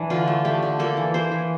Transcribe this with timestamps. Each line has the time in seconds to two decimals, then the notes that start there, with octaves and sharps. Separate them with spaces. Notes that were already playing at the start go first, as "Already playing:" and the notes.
Already playing: E3 D4
0.10 D3 F4
0.28 A3
0.45 A3 G4
0.62 D3
0.79 A#3 A4
0.97 E3
1.14 A#3 C5
1.31 E3